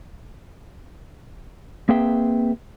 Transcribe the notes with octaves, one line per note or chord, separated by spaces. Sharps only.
A#3 C4 G#4 B4 E5 G5